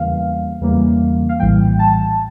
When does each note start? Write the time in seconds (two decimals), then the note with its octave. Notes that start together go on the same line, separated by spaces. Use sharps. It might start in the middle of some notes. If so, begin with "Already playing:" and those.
Already playing: E2 C#3 E3 G3 A#3 F5
0.61 E2 C#3 E3 G3 A#3
1.29 F5
1.39 A#1 A2 E3 G3 G5
1.79 A5